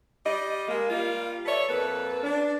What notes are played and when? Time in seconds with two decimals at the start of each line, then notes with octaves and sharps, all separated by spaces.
0.25 G3 D5 D#5
0.68 G#3 A#3
0.89 G3 A#3 F4
1.45 A4 B4 C#5 D5 E5
1.68 F2 A#3 A4 B4
2.23 D4